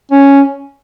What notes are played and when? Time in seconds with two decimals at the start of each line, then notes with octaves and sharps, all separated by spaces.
0.12 C#4